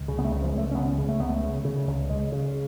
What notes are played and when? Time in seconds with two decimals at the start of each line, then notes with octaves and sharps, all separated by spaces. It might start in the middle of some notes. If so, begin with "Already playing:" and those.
Already playing: C#2
0.08 C#3
0.19 B3
0.24 A3
0.31 C#2
0.42 F3
0.53 C#2
0.58 A3
0.71 C#4
0.75 C#2 B3
0.98 C#3
1.08 A3
1.19 C#2 B3
1.30 A3
1.43 C#3
1.65 C#3
1.87 C#2
2.10 C#3 G#3
2.32 C#3